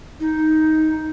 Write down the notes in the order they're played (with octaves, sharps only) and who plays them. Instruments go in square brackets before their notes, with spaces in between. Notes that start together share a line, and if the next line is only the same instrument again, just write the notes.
[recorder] D#4